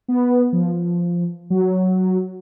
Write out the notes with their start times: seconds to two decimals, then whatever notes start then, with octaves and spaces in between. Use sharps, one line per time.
0.08 B3
0.53 F3
1.50 F#3